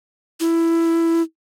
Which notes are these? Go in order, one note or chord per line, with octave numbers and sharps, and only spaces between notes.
E4